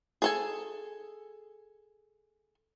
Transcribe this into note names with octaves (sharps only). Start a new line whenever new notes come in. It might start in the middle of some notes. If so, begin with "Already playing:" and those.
G#4 A4 G#5